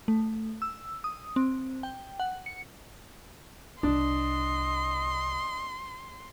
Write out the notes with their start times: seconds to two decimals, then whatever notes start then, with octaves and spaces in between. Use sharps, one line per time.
0.08 A3
0.62 E6
1.04 D#6
1.36 C4
1.83 G5
2.20 F#5
2.46 C#7
3.83 C2 D4 D#5 C6